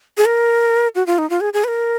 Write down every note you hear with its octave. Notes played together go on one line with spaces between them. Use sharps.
G#4
A#4
F#4
F4
D#4
F4
G#4
G#4
B4
A#4